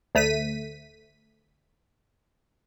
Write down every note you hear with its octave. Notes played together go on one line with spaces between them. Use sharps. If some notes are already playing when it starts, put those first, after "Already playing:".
D2 A3 B6 D#7